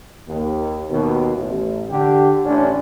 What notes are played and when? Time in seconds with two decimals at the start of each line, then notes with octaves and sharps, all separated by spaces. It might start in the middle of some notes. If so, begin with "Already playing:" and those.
0.27 D#2
0.90 D#2 B2
1.35 A1
1.89 D3 G4
2.45 A1 C#4 D4